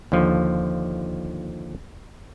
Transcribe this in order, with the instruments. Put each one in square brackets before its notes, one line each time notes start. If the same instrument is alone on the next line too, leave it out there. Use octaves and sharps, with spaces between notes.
[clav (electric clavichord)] D#2 D3 F3